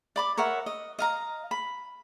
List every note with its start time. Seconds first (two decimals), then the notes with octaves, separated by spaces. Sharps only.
0.16 D5 B5 D6
0.37 A#4 C#5 E5 F#5
0.66 D#5
0.99 D#5 F5 A#5
1.51 B5